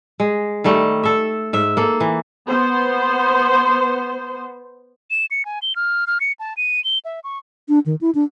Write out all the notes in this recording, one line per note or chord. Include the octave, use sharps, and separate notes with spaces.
G#3
D#3 G3 A3
A4 E5
G#2 E5
A#3 A4
E3
B3 C5
E7
C#7
G#5
G7
F6
F6
C#7
A5
D#7
G7
E5
C#6
D4
D#3
E4
D4